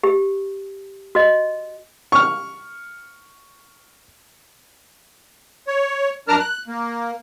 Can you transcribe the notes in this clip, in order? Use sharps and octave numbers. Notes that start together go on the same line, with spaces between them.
G4
F#4 D#5
C#6 F6
C#5
F#2 D4 A#4 A5 A#5 F6
F#6
A#3